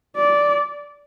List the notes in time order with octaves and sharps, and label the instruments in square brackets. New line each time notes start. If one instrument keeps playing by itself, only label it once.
[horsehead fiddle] D5